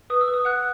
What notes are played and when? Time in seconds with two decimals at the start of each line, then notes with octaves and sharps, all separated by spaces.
0.10 B4 D#6
0.21 E6
0.28 B4
0.34 D#6
0.45 F#5 F#6